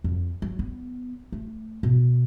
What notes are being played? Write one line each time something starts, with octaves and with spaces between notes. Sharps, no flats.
F2
F#3
B3
A3
B2